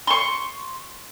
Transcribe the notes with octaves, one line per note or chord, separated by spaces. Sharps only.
C6 C#6